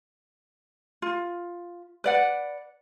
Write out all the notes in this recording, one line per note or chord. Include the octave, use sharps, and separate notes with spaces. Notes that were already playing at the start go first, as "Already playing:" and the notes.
F4
B4 D5 F#5